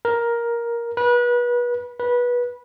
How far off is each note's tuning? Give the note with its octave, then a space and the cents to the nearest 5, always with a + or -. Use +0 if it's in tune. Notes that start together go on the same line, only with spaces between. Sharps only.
A#4 +10
B4 -30
B4 -20